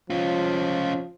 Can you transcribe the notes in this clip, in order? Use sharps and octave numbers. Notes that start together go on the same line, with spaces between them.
F3 C#4 F4